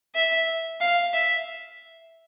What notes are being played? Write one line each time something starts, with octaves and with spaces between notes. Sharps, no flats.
E5
F5
E5